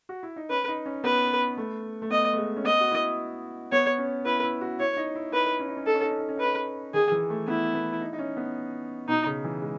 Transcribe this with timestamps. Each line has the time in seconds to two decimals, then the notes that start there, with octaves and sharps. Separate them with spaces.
0.09 F#4
0.23 E4
0.36 D#4
0.50 C#4 B4
0.68 D#4
0.86 C#4
1.04 B3 B4
1.57 A3
2.02 A3
2.11 B3 D#5
2.33 A3
2.37 G#3
2.57 C#4
2.64 B3 D#5
2.81 F#4
2.91 E4
3.72 B3 C#5
3.98 C#4
4.25 E4 B4
4.43 E4
4.61 F#4
4.79 E4 C#5
4.97 D#4
5.15 E4
5.33 D#4 B4
5.59 C#4
5.68 D#4
5.77 C#4
5.86 D#4 A4
5.94 C#4
6.03 D#4
6.11 C#4
6.20 D#4
6.29 C#4
6.37 D#4 B4
6.46 C#4
6.94 D#3 G#4
7.12 E3
7.30 A3
7.47 B3 E4
7.74 B3
8.01 D#4
8.13 D#4
8.19 C#4
8.37 B3
9.08 B2 D#4
9.26 C#3
9.44 E3
9.62 G#3